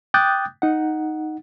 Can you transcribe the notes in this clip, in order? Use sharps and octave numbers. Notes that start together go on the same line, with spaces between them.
G5 D6 D#6 F#6 G6 A6
D#4 F#5